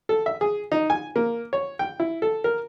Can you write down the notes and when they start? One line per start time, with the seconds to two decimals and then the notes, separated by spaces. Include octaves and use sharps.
0.09 A4
0.26 E5
0.41 G#4
0.72 D#4
0.90 G#5
1.16 A#3
1.53 C#5
1.79 G5
2.00 E4
2.22 A4
2.44 A#4